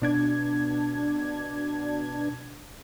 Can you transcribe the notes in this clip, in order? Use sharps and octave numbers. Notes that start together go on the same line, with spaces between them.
B2 D4 G#6